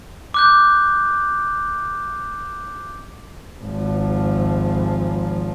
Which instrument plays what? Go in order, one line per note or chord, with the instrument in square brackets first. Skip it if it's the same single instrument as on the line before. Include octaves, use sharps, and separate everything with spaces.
[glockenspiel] D6 F#6 G6
[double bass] G#1 F3